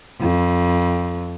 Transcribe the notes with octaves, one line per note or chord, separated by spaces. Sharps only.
F2